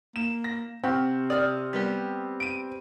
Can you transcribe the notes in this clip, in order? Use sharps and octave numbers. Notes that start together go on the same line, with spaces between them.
A#3 E7
A#6
C3 C4 G4 F#5 C#6 F6
D5 D#6 F6
G3 B3 G4
D7 D#7